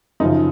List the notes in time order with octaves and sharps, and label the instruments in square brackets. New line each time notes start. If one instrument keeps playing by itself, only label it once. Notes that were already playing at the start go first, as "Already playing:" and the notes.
[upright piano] F#2 C#3 F3 D#4